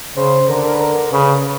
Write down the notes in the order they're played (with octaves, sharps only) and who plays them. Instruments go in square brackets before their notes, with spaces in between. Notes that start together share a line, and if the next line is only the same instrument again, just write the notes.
[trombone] C#3 [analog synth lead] C5
[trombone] D3 [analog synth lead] A#4
[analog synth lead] A#4
B4
A#4
[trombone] C#3 [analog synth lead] B4